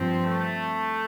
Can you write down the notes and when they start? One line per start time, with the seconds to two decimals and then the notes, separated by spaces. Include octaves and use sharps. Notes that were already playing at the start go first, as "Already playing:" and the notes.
Already playing: G2 F3 C4
0.23 A3